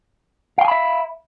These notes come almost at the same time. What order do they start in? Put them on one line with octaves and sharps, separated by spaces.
F5 G5 G#5 B5 E5